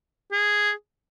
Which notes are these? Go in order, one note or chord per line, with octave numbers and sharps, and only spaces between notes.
G#4